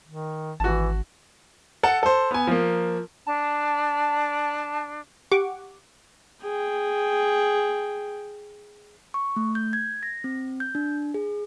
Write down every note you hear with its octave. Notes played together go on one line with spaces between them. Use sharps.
D#3
G#1 E3 F#4 A5
A4 F#5 A5
A4 C5
B3 G#5
F3 A#3
D4 A5
G4 F#5 C#6 D6
G#4 G5
C#6
A3
G6
G#6
A#6
C4
G6
D4
G#4